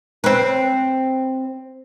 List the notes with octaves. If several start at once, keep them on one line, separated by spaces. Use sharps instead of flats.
C4 B4